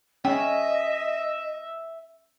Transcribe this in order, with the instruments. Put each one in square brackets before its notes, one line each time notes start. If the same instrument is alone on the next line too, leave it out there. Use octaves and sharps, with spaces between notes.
[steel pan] C#4 [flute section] D#5 [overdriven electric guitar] E5 [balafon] G5